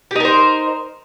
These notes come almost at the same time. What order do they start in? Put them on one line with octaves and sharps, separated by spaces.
G4 D#4 A#4 C5